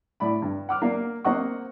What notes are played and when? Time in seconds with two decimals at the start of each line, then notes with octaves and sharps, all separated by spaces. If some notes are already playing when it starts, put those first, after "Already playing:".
0.20 A2 D5 B5
0.42 G2
0.69 F#5 D6 F6
0.82 A#3 D5 F5
1.24 A#3 C4 D#5 F#5 C#6